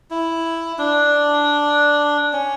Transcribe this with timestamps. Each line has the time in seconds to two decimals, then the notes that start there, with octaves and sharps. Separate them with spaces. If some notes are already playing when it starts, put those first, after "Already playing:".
0.10 E4
0.78 D4
2.33 C#4